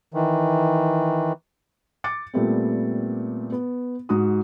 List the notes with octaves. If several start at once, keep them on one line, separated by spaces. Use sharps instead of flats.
D#3 E3
D6 A6 C#7
A#2 G3 A3 B3 C4
B3
G#2 F#4 D#6